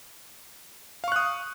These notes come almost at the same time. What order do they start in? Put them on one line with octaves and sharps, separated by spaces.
F5 C#6 F#6 D#6